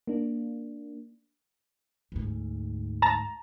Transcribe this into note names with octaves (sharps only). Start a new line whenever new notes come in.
A#3 D4
D2 G#2
A5 A#5